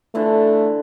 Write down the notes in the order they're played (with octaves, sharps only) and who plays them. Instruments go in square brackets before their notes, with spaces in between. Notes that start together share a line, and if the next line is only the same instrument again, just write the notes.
[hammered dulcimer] D3 E3 F4 [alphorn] A3